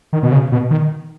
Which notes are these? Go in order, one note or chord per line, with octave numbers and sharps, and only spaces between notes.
D#3
B2
C#3
B2
D#3